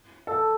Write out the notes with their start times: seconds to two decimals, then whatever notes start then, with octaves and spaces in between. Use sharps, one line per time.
0.27 A4